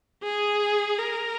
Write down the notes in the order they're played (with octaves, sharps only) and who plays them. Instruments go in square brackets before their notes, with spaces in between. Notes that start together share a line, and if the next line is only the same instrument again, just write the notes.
[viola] G#4
A#4